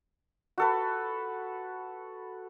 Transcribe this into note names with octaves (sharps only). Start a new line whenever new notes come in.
F#4 A4 B4